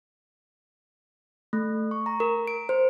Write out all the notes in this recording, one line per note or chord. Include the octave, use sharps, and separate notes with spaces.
A3
C#6
A#5
A#4
D7
C5